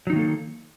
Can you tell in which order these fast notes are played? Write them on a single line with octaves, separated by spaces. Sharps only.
F#3 D#4 D#3 A#3 A4